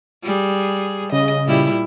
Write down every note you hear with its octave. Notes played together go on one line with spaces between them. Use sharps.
G3 G#4
C#3 D#5
A#2 G3 E4